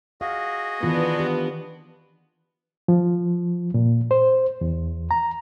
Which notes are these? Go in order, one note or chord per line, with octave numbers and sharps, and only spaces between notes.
F#4 G#4 D#5 F5
D#3 E3 B3 D4 F4
G4
F3
A#2
C5
E2
A#5